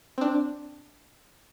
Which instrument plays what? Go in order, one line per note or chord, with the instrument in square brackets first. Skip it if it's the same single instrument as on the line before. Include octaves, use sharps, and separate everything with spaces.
[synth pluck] C4 D4